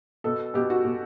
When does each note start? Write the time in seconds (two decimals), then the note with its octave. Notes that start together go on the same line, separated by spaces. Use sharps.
0.24 B2 A4
0.54 B2 G4
0.70 F#4
0.85 B2